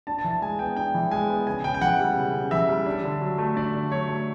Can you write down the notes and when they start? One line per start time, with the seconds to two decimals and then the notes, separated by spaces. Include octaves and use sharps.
0.07 D4 A5
0.19 A5
0.24 E3
0.31 A5
0.42 G#3 G#5
0.59 B3 G5
0.76 D4 G5
0.94 E3
1.11 G#3 G#5
1.30 B3
1.47 C#3 G#5
1.64 C#3 G5
1.74 G5
1.81 E3 F#5
1.99 G3
2.17 C#3
2.34 C#3
2.51 E3 E5
2.69 G3
2.86 D4
3.04 D3
3.21 F#3
3.38 A3
3.56 D4 D5
3.74 D3
3.91 F#3 C#5
4.09 A3